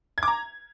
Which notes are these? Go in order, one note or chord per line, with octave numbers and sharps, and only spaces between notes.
G#6
D6
A#5